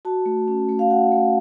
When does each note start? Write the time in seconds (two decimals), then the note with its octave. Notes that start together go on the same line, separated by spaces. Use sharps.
0.05 F#4 A5
0.26 A3
0.48 C#4
0.69 A3
0.79 F5
0.90 F#4 F#5
1.12 A3